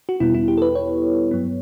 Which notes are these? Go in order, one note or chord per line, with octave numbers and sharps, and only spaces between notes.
F#4
E2 B2 G3 B3 E4
E4
G4
A4
B4
C#5
G2 F#3 B3